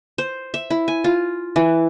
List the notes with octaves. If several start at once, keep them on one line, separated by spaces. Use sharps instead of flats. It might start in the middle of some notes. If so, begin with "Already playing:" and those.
C5
E5
E4
G#5
F4
E3